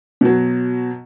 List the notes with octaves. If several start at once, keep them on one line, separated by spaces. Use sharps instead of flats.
B2 F#3